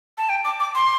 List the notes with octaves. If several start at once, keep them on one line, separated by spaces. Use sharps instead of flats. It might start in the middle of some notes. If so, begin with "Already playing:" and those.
A5
G5
D6
D6
C6